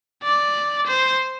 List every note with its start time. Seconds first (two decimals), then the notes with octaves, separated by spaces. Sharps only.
0.23 D5
0.87 C5